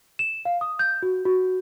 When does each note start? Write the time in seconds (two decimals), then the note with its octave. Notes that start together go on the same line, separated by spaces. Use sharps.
0.19 E7
0.45 F5
0.61 D#6
0.79 G6
1.03 F#4
1.25 F#4